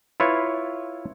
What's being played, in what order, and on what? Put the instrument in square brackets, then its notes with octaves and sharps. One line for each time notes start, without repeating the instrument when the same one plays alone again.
[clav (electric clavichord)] E4 F4 B4 C#5